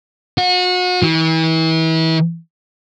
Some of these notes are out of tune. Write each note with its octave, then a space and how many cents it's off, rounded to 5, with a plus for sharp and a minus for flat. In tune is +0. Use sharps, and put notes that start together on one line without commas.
F#4 -35
E3 -35